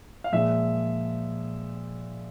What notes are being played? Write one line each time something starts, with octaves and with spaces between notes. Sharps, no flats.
F5
A#2 F3 G#3 E5